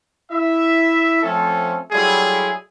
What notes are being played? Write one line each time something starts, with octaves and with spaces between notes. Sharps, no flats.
E4 E5
F3 A3 C4 C#4 A4
F#3 G3 A3 E4 F4 G#4